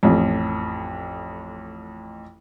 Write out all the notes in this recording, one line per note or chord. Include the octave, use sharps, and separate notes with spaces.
A1 F2